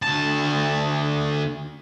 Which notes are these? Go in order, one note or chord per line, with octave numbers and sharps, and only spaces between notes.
D2 A5